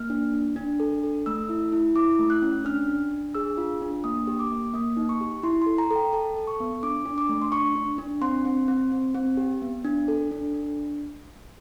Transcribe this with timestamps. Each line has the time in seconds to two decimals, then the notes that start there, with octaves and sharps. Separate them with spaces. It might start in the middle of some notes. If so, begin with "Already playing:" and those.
Already playing: A#3 F6
0.10 D4
0.34 D4
0.56 D4
0.80 A4
1.03 A4
1.26 A3 E6
1.49 E4
1.72 E4
1.95 E4 D6
2.19 A3
2.30 F#6
2.42 C#4
2.65 D4 F6
2.88 D4
3.12 D4
3.35 G#4 E6
3.57 F4
3.82 D4
4.04 A#3 D#6
4.27 G4
4.39 D6
4.51 A#3
4.74 A#3 D#6
4.97 D#4
5.09 C#6
5.21 G4
5.43 E4 C6
5.62 C6
5.66 A4
5.78 A#5
5.91 A4
5.96 G5
6.13 A4 A5
6.36 A4
6.47 C#6
6.60 B3
6.83 D4 D6
7.05 D4
7.18 D6
7.29 A3
7.42 C6
7.52 D4 C#6
7.76 D4
7.98 D4
8.21 C4 C6
8.45 C4
8.68 C4
8.92 C4
9.14 C4
9.37 G4
9.62 B3
9.85 D4
10.08 A4
10.31 D4
10.53 D4